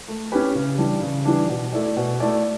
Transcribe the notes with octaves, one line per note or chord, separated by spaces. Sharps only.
A3
C#4 E4 G4 B4
C#3
E3 G3 D4
C#3
E3 G3 D4
B2
A3 E4 A4 D5
B2
A3 E4 A4 D5